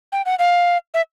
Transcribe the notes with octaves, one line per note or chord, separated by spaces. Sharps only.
G5
F#5
F5
E5